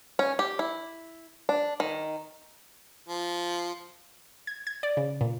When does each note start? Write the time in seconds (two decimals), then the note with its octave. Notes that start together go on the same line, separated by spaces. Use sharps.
0.19 C#4
0.39 G4
0.59 E4
1.49 D4
1.80 D#3
3.08 F3
4.47 G#6
4.67 G#6
4.83 D5
4.97 C#3
5.21 A#2